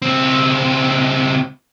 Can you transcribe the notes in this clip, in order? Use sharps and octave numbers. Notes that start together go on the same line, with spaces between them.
C#2 C4